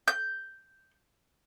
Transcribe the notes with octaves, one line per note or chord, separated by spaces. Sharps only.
G6